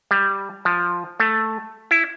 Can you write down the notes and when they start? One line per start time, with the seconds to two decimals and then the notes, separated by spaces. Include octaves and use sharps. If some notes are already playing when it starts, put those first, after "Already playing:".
0.11 G3
0.65 F3
1.20 A3
1.91 E4